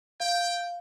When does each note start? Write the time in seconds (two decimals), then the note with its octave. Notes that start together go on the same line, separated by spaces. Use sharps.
0.20 F5 G5